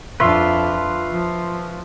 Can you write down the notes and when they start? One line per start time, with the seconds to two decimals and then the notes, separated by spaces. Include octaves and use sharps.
0.20 F2 D4 F4 B4 E5 C6 C#6
1.12 F3